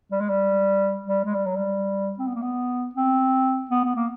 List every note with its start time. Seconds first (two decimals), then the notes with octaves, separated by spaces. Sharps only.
0.11 G3
0.20 G#3
0.29 G3
1.06 G3
1.25 G#3
1.35 G3
1.46 F#3
1.56 G3
2.19 C4
2.27 B3
2.35 A#3
2.42 B3
2.95 C4
3.71 B3
3.84 B3
3.96 A#3